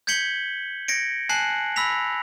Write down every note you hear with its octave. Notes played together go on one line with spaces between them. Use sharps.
G6 G#6 B6 C#7 F#7 G7
G#6 A#6 C#7 D7
G#5 A5 F#6 C7 F#7
B5 E6 A#6 B6 F7